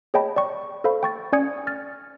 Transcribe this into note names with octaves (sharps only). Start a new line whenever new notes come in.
G#4 C#5 D#5 G5 A5 B5
D5 G5 C#6
A4 C5 F5 B5
G5 C#6 A6
C#4 D5 G#5 D#6 G#6 C#7
F6 A6